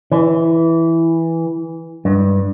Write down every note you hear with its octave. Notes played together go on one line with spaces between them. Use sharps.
E3
G2